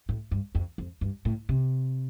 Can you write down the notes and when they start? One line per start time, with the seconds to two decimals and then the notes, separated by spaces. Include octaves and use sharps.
0.09 A2
0.31 G2
0.55 F2
0.78 F2
1.01 G2
1.25 A2
1.49 C3